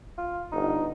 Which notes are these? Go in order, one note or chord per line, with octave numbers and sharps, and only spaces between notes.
F4
G1 D#4